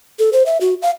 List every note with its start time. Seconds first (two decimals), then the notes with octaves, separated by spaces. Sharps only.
0.19 A4
0.33 C5
0.46 E5
0.61 F#4
0.82 F5